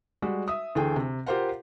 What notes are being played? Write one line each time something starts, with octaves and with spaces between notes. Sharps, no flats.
G3 G#3 F#4
E5 D#6
D2 E3 A3 G#4 G5
C3
F4 G4 A#4 C5 F5 F#5